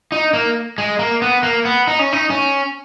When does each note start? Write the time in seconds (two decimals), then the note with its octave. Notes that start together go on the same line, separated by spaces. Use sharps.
0.12 D#4
0.33 A#3
0.78 G#3
0.99 A#3
1.22 B3
1.43 A#3
1.65 B3
1.87 D#4
1.99 C#4
2.13 D#4
2.30 C#4